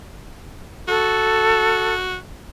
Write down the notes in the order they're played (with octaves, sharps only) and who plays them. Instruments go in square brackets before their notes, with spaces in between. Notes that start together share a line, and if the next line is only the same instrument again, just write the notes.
[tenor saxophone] F#4 [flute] A4